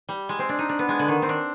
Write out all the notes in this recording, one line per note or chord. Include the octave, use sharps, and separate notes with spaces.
G3
G#3
C4
D4
D#4
D4
B3
G#3
D3
D#3
C4
D4